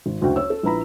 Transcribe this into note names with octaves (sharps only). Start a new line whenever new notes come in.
G#1
F#1 D2 F#4 G5
C#5 E6
A4
A#1 E4 B4 A#5 B5